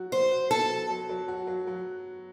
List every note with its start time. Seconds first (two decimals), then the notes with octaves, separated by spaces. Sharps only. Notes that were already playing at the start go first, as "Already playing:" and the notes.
Already playing: F#3 F#4
0.12 F#3 C5
0.31 F#4
0.51 B3 A4
0.70 F#3
0.90 F#3
1.09 F#3
1.28 F#4
1.47 F#3
1.67 F#3